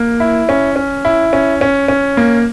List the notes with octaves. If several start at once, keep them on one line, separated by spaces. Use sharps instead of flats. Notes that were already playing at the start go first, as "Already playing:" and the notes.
Already playing: A#3
E4
C#4
C#4
E4
C#4
C#4
C#4
A#3